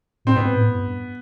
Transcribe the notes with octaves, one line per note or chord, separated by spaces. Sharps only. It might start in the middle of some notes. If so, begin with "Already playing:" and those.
A2 C4
G#2 B3
A2
G2